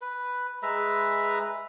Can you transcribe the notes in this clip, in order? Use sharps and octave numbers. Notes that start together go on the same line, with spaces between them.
B4
G#3 B4 E5 A#5